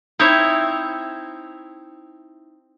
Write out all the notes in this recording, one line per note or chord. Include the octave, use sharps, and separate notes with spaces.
C4 D#4 E4 C#5 E5